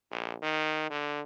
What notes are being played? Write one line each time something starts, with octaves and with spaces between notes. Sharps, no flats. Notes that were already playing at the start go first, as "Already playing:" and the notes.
A#1
D#3
D3